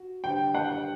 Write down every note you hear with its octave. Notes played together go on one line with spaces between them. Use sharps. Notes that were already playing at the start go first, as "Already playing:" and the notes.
Already playing: F#4
D3 G3 D4 G4 C5 G5
F#5